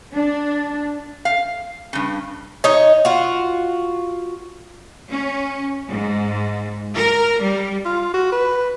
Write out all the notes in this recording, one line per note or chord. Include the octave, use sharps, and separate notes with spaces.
D4
F5
G2 C#3
D#4 C#5
F4 F#4
C#4
G#2
A#4
G3
F4
F#4
B4